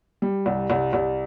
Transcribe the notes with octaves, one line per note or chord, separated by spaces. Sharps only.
G3
C2
C2
C2